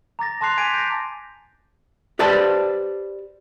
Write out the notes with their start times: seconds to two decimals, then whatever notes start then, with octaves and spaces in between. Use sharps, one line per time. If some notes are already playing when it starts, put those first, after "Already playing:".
0.19 A#5 D6 A6 A#6
0.41 A5 C6 D6 F#6 C7 F7
0.57 G#5 G#6 B6 D7 D#7 F7
0.74 G6 A#6
2.19 G4 B4 C5 D5 A5